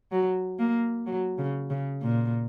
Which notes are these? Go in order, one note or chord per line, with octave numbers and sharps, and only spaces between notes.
F#3
A#3
F#3
C#3
C#3
A#2